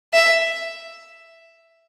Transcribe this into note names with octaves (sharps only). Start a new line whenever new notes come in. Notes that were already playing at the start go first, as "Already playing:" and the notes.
E5